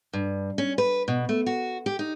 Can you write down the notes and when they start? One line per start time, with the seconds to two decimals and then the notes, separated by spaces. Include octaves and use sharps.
0.13 G2
0.58 C#4
0.78 B4
1.08 B2
1.29 A3
1.46 F#4
1.86 G4
1.99 D#4